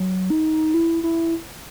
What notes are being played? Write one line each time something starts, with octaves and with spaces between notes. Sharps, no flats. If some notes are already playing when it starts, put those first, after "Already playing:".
Already playing: F#3
D#4
E4
E4